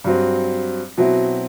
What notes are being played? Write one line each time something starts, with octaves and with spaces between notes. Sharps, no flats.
G2 F#3 C4
B2 F#3 C4 E4